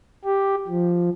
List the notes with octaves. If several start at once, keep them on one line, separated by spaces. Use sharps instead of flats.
G4
F3